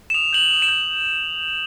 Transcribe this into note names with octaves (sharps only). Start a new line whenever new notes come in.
E7
D#6 F7
G6 F#7
F7
D#6
E7
G6